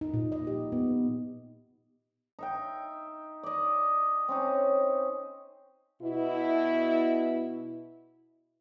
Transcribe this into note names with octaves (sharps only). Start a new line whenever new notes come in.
D#4
A#2
D#5
G4
B3
D#4 E5 G5
D5 D#5
C4 C#4 D#4
B2 E4